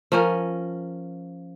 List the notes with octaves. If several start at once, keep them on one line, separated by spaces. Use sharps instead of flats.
F3 C#4 A#4